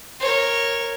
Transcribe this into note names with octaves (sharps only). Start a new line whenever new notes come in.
A#4 C#5